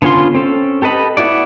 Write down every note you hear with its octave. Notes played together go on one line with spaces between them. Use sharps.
D3 B3 C#4 F4 C6
C4 C#4 A4
G4 A4 B4 D#5 B5
B3 E4 F#4 D5